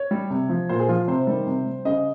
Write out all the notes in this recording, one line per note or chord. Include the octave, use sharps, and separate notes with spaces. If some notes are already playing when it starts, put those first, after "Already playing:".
Already playing: C#5
G3
C3
F3
A#2 C5
G#4
F3 F4
C3 C5
D#3 G3
C3
G3
C#3 D#5